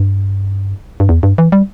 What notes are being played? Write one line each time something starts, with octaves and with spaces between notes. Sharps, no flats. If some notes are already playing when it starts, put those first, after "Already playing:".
Already playing: G2
G2
E2
G2
E3
G3